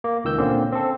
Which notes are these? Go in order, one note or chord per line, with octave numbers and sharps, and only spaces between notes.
A#3
C#2 D#3 E6 G6
A#2 D3 A#3 C4 C#4
C4 A4